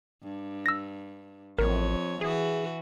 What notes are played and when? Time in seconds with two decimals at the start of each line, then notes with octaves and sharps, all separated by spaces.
0.23 G2
0.66 E6 A#6
1.59 A1 F2 A#4 C#5
2.21 E3 F#4 G#4